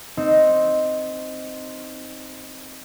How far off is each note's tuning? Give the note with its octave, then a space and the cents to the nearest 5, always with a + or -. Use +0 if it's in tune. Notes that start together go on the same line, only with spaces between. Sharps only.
C4 +0 D#4 +0